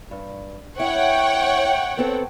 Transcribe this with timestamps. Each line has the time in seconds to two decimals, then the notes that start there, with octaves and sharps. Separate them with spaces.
0.11 G2
0.80 E4 C#5 F#5 G5
1.97 B3 C4 A4